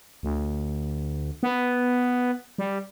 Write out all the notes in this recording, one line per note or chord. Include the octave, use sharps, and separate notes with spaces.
D2
B3
G3